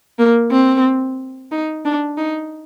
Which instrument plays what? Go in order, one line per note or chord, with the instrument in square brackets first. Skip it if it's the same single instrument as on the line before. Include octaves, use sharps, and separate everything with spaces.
[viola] A#3
C4
D#4
D4
D#4